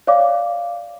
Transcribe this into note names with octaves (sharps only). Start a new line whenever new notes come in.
C#5 D5 F5 D6